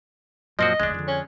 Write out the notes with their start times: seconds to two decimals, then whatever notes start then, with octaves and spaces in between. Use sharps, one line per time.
0.59 F#2 A#2 F3 C4 F#4 D#5
0.80 F1 D2 G#3 D4
0.94 F2 D3
1.08 C#4